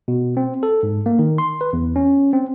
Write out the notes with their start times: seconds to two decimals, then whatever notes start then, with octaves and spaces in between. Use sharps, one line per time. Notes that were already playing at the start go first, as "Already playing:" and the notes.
0.08 B2
0.37 C4
0.63 A4
0.83 G#2
1.06 A#3
1.19 D#3
1.38 C6
1.61 B4
1.73 E2
1.96 C#4
2.33 C4